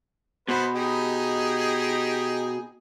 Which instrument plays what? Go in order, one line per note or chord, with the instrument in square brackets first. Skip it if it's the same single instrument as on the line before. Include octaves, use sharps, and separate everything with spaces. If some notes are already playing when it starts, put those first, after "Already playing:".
[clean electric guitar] B2 [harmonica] B3 B4 C5
[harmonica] D#4 G4 G#4